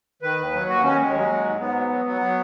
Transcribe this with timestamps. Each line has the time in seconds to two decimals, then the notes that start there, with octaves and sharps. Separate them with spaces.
0.22 D#3 B4
0.37 D#2
0.53 F#3
0.69 D#2 F#4
0.83 D#3 C#4
0.99 D#2 G#3
1.15 F#3
1.29 F#3
1.45 G#2
1.59 G#2 B3
1.75 F#3
1.90 F#3
2.06 F#3 B3
2.21 F#3